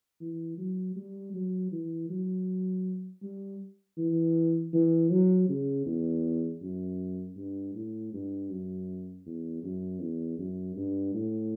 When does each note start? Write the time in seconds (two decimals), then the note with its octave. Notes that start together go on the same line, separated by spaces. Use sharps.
0.21 E3
0.58 F#3
0.96 G3
1.34 F#3
1.72 E3
2.10 F#3
3.22 G3
3.98 E3
4.73 E3
5.10 F#3
5.49 C#3
5.86 E2
6.62 F#2
7.37 G2
7.75 A2
8.13 G2
8.50 F#2
9.26 E2
9.64 F#2
10.01 E2
10.39 F#2
10.76 G2
11.14 A2